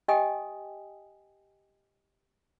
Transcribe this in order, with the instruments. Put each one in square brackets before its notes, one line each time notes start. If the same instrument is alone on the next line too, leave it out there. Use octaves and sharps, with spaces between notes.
[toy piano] G4 D#5 G5 G#5 D#6